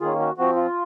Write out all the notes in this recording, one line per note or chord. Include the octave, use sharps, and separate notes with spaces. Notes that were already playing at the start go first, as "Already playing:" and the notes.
D#3 A#3 C#4 F4 G#4
F#4
F3 C4 F#4
F4